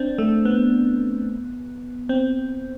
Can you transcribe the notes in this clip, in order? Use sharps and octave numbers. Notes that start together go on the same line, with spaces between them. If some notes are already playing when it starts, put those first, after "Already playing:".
Already playing: C4 D4
A3
B3
C4